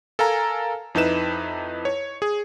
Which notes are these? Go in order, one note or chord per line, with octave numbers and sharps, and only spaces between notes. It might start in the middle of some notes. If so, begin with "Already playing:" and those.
A4 A#4 F5 G#5 A#5
F2 D#4 E4 B4 E7
C#5
G#4